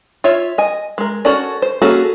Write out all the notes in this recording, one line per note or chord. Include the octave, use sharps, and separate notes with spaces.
F4 C#5 E5
D#5 G#5
G#3 A#4
C#4 F#4 A4 A#4 D5
C5
A#3 C#4 F#4 G#4 A4